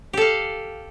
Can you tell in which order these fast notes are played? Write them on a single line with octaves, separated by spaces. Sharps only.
G4 A4 F5